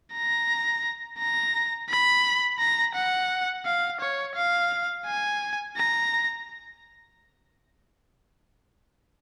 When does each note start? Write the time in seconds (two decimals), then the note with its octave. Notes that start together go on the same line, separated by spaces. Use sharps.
0.13 A#5
1.19 A#5
1.90 B5
2.60 A#5
2.95 F#5
3.66 F5
4.01 C#5
4.35 F5
5.06 G#5
5.77 A#5